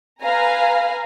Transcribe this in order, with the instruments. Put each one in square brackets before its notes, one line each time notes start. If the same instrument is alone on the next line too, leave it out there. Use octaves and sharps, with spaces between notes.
[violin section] B4 F5 G#5 A#5